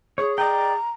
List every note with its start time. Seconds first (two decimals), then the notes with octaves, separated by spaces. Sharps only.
0.18 G#4 C#5
0.38 D5 D#5 G5 A#5